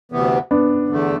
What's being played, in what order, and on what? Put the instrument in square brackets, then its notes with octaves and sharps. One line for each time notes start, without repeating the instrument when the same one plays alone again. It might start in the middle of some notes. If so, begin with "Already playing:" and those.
[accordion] D2 C3 E3 B3
[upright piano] B3 D4
[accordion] E2 D3 A3